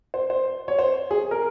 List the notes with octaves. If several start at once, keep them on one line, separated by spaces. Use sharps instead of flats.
C5
C5
C#5
C5
G#4
A#4